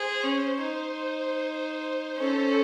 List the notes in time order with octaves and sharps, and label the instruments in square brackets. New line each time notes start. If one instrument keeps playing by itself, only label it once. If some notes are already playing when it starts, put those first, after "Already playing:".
Already playing: [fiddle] G#4 [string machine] C5
[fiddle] C#4
D#4
[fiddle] C#4 [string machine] A4